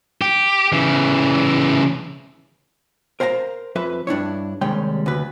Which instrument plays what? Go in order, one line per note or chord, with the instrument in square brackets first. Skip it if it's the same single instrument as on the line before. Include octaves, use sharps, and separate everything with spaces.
[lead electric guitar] G4
C#3 E3
[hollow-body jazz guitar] A#4 C5 F5 G#5 A#5
F2 B4 E5
G2 D4 E4 C#5
D#2 C3 G3 G#3 C#5 G5
D2 B4